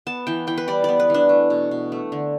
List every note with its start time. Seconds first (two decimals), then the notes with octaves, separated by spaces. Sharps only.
0.07 B3 A5
0.27 E3 G5
0.47 E3 G5
0.57 B4
0.67 G3 D5
0.84 B3 D5
1.00 B4
1.10 E3 D4
1.29 A3
1.50 B2
1.71 B2
1.92 A3
2.12 D3